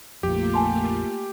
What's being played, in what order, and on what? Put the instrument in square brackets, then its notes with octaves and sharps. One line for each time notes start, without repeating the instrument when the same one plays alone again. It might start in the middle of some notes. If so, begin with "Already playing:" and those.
[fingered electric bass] A#1 F2 [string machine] A3 A#3 F4 [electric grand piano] G4
[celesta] G#5 A5 C6